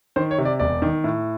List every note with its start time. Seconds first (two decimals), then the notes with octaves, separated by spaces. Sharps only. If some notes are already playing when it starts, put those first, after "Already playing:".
0.16 D#3 C5
0.31 C#5
0.38 C3
0.45 D5
0.59 E1 D5
0.82 D#3
1.04 A2